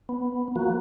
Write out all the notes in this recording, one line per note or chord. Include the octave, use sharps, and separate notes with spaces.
B3
F3 A#3 F#4